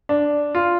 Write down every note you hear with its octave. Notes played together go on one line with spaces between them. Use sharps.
D4
F4